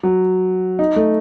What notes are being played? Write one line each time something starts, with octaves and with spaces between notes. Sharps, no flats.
F#3
D#4
A3